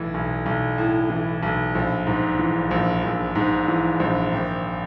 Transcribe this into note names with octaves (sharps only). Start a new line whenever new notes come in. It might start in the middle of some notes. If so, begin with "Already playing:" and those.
Already playing: B1 A2 E3
B1
B1
A2
E3
B1
A#1
G#2
E3
A#1
A#1
G#2
E3
A#1
G#1